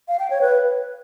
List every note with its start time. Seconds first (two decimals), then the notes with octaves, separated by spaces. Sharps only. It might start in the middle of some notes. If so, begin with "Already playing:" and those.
0.08 F5
0.19 G5
0.30 C#5
0.41 B4